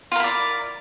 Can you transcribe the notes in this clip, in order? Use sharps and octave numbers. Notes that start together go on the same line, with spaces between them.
E4 F4 A#4 D5